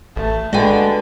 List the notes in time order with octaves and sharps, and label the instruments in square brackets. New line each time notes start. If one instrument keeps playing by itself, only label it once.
[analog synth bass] A1 [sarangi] A3
[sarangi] D3 [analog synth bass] G#3 [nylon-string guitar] F#4 G#4 B4 [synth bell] D5 D#5 G5